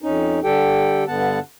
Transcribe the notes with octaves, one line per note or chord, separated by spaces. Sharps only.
F2 C#4 D#4
D3 G3 G4 A4 G5
G2 D3 B3 F#5 A5